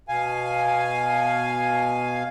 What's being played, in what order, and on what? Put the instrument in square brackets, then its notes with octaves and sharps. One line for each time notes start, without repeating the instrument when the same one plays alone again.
[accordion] B2 F5 G#5